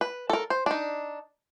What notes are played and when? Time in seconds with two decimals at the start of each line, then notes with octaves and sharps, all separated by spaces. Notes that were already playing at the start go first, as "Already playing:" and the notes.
0.01 B4
0.30 A4 A#4
0.50 C5
0.66 D4 D#4